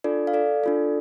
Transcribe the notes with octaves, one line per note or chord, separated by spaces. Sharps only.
D4 F4 A4 D5
F5
A4 D5
D4 F4 A4